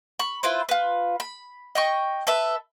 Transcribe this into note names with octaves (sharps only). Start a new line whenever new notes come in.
B5 C#6
E4 F4 B4 C5
F4 B4
B5
D#5 G5 C#6
A4 B4 E5